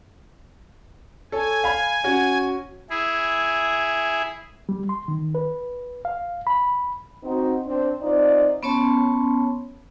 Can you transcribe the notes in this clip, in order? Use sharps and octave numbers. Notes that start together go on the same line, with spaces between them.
A4 C#5 G#5
F5 B5
C#4 F#4
E4 G#4
G3
C6
D#3
B4
F5
B5
C4 D#4 F#4
C4 D4
C4 D#4 F4 C5 D5
B3 C#4 C#5 A5 C6